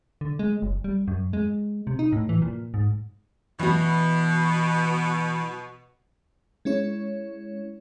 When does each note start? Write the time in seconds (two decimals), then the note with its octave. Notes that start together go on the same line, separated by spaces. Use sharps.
0.21 D3
0.39 G#3
0.62 F#1
0.84 G3
1.08 F#2
1.33 G#3
1.87 C3
1.99 D#4
2.12 A2
2.29 E3
2.42 A#2
2.74 G#2
3.59 B2 E3 F#4
6.65 G#3 C#4 E4 C#5